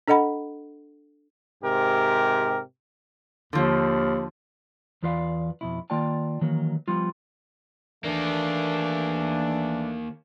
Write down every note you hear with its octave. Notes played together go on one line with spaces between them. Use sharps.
D4 A4 D#5 F#5 B5
G#2 C3 G4 A#4
D#2 D3 F3
E2 E3 F4 B4 D5 F5
F2 B2 E4
D#3 A#3 F4 D5 G5 A5
D#3 E3 F#3 A#3
F3 G3 B3 F4
D#3 E3 A3 A#3 D4